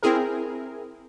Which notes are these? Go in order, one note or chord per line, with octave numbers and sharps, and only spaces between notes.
C4 E4 G#4 A#4